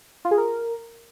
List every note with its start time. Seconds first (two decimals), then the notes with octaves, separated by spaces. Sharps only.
0.25 F4
0.31 G#4
0.38 A#4